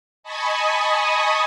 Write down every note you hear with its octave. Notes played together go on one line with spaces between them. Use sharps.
D#5 G#5 A5 B5 C#6 D#6